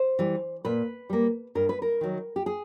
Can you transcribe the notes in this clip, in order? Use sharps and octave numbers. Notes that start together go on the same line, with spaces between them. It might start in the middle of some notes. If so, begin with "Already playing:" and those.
Already playing: C5
E3 G3
A#2 B4
G3 A#3
G2 A#4
B4
A#4
D#3 F#3
G4
G#4